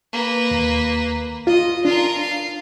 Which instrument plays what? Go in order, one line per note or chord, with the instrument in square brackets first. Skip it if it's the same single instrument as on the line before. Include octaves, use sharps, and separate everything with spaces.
[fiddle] A#3 B4
[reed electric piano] D#2
[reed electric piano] F4 [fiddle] D#5
[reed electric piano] D4 [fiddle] F4 A#4
[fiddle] F5